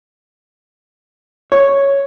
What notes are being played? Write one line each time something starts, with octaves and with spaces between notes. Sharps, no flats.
C#5